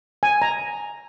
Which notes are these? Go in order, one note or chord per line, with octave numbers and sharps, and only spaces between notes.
G#5
A#5